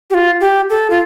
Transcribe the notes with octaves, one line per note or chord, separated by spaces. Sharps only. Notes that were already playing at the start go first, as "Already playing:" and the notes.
G4
F4
G4
A4
F4